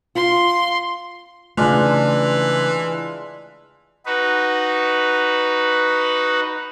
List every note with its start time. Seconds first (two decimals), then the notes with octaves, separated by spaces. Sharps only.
0.15 F4 C6
1.57 C#3 E3 G#3 A3 D4 F4
4.06 D#4 F#4 B4